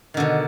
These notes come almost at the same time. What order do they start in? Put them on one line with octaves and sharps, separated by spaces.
D#3 D3 B2